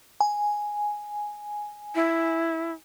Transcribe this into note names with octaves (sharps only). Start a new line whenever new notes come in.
G#5
E4